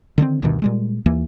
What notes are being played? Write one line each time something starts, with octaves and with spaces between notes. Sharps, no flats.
D3 D#3 A#3 C4
D2 G2 B2 D#3
A#2 G3 G#3
D#2 E3 A#3